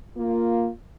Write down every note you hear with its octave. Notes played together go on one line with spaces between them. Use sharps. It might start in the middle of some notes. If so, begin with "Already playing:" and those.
A#3 F4